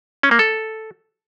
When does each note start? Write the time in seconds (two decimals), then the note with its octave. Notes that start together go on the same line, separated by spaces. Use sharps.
0.23 C#4
0.31 A#3
0.39 A4